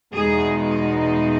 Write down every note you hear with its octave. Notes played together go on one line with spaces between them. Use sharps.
E2 B2 G#3 D#4 G#4